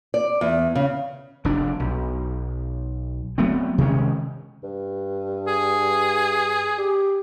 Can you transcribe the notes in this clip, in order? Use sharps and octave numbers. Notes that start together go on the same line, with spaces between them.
D5
E2
C#3
F1 D4
B1
F#3 A3 B3 C4
C3 D#3 G#3 C#4
G2
G#4
G4